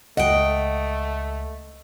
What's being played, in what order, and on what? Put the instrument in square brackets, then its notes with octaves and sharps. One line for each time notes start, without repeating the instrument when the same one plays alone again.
[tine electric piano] C#2 [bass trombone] A3 [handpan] D#5 [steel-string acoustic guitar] F#5 G5